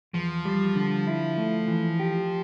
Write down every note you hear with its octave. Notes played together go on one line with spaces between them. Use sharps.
E2 F3
G3
D3
E4
A3
E3
G4